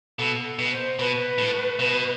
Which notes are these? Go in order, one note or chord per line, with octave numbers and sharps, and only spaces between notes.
B2 A4
B2
C5
B2 B4
A2
B2